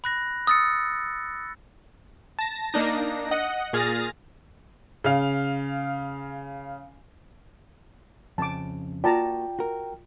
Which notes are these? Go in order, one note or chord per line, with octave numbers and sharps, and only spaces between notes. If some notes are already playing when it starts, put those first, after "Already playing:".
B5 F#6 A#6
D#6 E6 A6 C#7
A5 A#6
A#3 D4 D#4 A#6
D#5 F#5
A#2 G#4 F6 A6 A#6
C#3 F5
F2 C#3 A5 D6
A#3 F4 F#4 D5 G5 A5 A#5
F#4 A#4